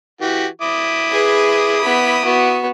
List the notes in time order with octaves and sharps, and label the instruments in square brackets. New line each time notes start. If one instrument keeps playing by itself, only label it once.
[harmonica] E3 F#4 G4
E4 D6 D#6
[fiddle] G#4 B4
B3 B5
B3 F#4